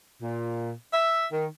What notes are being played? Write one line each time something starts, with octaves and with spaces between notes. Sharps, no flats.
A#2
E5
D#3